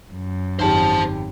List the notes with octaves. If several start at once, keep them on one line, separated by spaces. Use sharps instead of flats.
F#2
G#1 G4 C5 A5